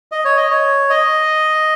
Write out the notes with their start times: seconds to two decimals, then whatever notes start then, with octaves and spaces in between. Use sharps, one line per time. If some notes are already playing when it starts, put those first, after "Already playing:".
0.12 D#5
0.25 C#5
0.37 D#5
0.51 C#5
0.90 D#5